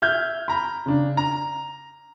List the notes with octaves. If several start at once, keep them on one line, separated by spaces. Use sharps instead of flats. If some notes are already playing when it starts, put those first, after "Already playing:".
E5 F6 G6 G#6
A#5 B5
C#3 D4
A#5